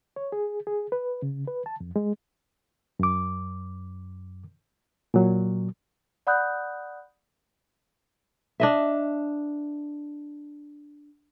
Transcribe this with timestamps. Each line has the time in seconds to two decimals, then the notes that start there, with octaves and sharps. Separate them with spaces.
0.16 C#5
0.32 G#4
0.67 G#4
0.92 B4
1.22 C#3
1.48 B4
1.66 A5
1.80 F2
1.96 G#3
2.99 F#2 D6
5.14 A#2 F#3
6.27 D5 F#5 B5 D#6 F#6 G6
8.60 D4 D#5 E5